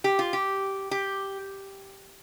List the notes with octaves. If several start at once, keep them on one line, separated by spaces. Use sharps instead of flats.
G4
F4
G4
G4